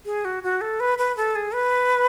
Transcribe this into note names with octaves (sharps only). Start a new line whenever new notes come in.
G#4
F#4
F#4
A4
B4
B4
A4
G#4
B4